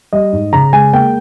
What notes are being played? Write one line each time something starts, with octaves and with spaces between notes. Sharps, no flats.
G3 D#5
G#2
C#3 A#5
G#3 G#5
A#3 G5